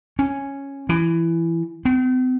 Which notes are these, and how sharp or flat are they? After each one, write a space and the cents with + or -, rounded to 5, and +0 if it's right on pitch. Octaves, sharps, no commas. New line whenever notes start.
C#4 -5
E3 +15
C4 -45